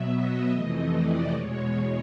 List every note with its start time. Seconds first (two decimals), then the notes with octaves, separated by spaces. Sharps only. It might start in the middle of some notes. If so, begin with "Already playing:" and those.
Already playing: B2 F#3 B3 E5
0.11 D#5
0.51 F2 C3 E3 A3 D#5
0.92 D5
1.31 E2 B2 G#3 C#5
1.72 C#5